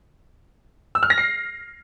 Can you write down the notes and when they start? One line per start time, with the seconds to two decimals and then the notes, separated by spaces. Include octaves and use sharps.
0.95 E6
1.03 F6
1.10 A#6
1.18 C7